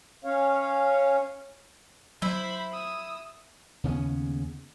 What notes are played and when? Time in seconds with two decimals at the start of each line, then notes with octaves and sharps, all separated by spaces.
0.25 C#4 C#5 F5
2.22 F#3 E4 C5 B5
2.73 D#6 E6
3.84 D#2 C#3 B3 C#4